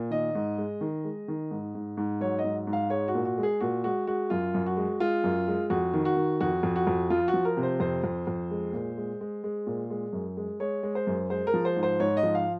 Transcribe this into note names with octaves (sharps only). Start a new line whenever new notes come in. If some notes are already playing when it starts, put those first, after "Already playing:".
Already playing: A#2
D#3 D#5
G#2
G#3
D#3
G#3
D#3
G#2
G#2
G#2
F#3 C#5
D#5
G#2
G#2
F5
G#3 C#5
F#4
A#2
F#4
G#3
G#4
A#2 F#4
G#3 F#4
G#3 F#4
F#2 F4
F#2
F#4
G#3
G#3 F4
F#2
G#3
F2 F#4
D#3
F#4
D#3
F2 F#4
F2
F#4
F2
F3 F4
F#4
F3
A#4
C3
C5
F2 C5
F2
F2
G#3
A#2
G#3
G#3
G#3
A#2
G#3
F#2
G#3
G#3 C#5
G#3
C5
F#2
G#3 C5
A#4
F3
C5
G#2
C5
G#2 C#5
D#5
F3
F5